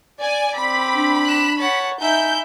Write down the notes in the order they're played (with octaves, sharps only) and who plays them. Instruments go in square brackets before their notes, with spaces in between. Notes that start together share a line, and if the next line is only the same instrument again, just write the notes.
[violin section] D5 G#5
[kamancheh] C4 D6 [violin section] B5
[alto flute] D4
[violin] F#6 E7
[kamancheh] C#5 [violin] F#5 A5
[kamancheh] D#4 [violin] E4 E5 [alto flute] G#5 [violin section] G6